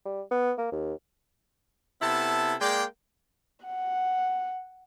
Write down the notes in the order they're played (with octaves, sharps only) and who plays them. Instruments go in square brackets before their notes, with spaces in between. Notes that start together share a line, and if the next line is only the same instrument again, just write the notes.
[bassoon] G3
B3
A#3
D#2
[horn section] C3 B3 E4 A4 A5
G#3 A#3 D5 G5
[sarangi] F#5